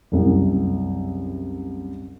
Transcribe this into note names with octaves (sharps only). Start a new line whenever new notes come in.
F#1 C2